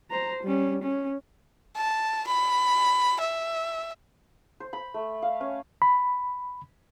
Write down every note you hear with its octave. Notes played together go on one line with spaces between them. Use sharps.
C5 A#5
G3 C#4
C#4
A5
B5
E5
C5
B5
A3
F5
C#4
B5